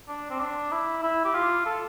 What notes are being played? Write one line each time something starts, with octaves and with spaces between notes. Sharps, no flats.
D4
C4
D4
E4
E4
G4
F4
A4